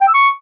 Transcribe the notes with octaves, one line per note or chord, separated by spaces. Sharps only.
G5
E6
C#6